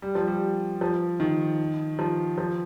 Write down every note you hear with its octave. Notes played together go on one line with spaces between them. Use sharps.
G3
F3
G3
F3
D#3
F3
F3